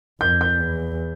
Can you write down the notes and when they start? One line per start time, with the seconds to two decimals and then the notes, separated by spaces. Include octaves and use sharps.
0.21 F2 G6
0.41 G6
0.60 E2